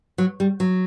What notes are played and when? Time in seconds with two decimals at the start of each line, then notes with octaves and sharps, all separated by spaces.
0.18 F#3
0.40 G3
0.60 F#3